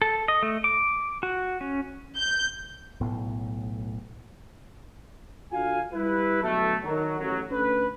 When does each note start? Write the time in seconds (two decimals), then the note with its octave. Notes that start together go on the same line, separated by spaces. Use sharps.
0.02 A4
0.28 D#5
0.43 A3
0.64 D6
1.23 F#4
1.61 C#4
2.16 G6
3.01 B1 A2 B3
5.51 D3 F4 F#4 F5 G#5
5.93 G3 E4 B4
6.42 B2 D3 F#3 A3
6.83 D#3 F#3
7.19 A1 F#3
7.51 D3 A3 C#4 B4